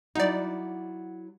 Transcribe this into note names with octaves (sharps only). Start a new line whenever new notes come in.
F#3 D#4 E4 F#4 D5